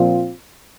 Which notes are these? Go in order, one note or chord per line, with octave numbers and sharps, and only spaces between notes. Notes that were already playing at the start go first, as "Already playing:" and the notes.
Already playing: A#2 F3 C4 F4